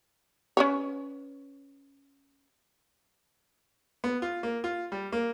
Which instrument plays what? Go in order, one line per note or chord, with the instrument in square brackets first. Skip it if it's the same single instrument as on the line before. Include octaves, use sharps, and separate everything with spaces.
[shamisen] C#4 B4 C#5
[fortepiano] B3
F4
A#3
F4
G3
A#3